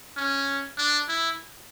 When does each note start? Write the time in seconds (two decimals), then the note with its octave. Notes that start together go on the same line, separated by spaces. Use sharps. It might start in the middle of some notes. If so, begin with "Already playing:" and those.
0.17 C#4
0.78 D4
1.09 E4